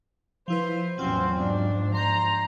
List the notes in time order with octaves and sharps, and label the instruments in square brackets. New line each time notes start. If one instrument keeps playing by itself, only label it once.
[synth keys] F3 E4 B4 [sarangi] C5
[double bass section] E2 A2 C#4 [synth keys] F#3 F4 [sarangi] C4
[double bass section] G#2 F3 [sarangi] D4
[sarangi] A#5 [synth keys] C6 G6